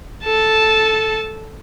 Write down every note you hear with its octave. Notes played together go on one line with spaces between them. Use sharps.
A4 A5